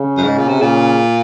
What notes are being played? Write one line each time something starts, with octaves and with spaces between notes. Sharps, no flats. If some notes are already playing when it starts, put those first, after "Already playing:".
Already playing: C#3
F#2
G#2
A#2
C3
A#2 C#3